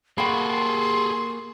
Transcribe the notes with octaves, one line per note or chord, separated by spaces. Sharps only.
A#3 F#4 G#4 A4 G5 B5 C6